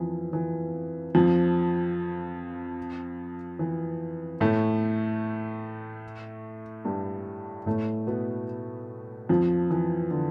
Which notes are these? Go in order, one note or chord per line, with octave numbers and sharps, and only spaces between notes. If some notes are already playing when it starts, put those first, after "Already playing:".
Already playing: F2 E3 F3
E3
F2 F3
E3
A2 A3
G2 G3
A2 A3
B2 B3
F2 F3
E3
D3